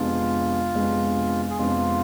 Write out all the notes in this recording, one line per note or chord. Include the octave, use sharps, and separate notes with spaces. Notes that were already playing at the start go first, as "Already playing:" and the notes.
Already playing: F2 C3 G#3 B3 D4 F4
F2 C3 G#3 B3 D4
G#4
F2 C3 G#3 B3 D4 F4